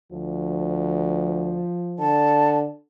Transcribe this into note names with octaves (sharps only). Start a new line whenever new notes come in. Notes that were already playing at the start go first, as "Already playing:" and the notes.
D2 F3
D3 A5